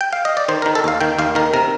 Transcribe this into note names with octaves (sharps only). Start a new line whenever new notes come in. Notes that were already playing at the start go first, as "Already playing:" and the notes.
G5
F5
D#5
D5
D#3 C5
A#4
D#3
A4
D#2 F5
D#3 G5
D#2 F5
D#3 A#4
C3 A#4